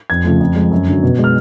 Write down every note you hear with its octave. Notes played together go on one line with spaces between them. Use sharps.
F2 G#6
C#3 F3 A3
F2
F3 G#3
F#2
D3 F#3
B2
G#3
F6